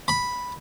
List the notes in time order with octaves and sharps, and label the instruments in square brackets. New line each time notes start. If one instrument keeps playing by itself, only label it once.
[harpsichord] B5